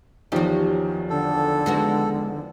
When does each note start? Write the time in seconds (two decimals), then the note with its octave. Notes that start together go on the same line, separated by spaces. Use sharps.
0.32 E2 D#3 F3 F#3 G4
1.10 D3 A4
1.66 G#3 B3 F#4